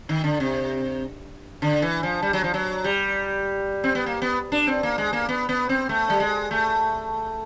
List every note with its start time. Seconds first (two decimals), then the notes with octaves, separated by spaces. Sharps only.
0.09 D#3
0.24 D3
0.40 C3
1.62 D3
1.82 E3
2.03 F3
2.22 G3
2.33 F#3
2.44 F3
2.54 F#3
2.84 G3
3.84 C4
3.95 B3
4.06 A#3
4.22 B3
4.52 D4
4.67 C4
4.83 A#3
4.98 G#3
5.13 A#3
5.29 B3
5.49 B3
5.69 C4
5.89 A3
6.10 G3
6.20 G#3
6.51 A3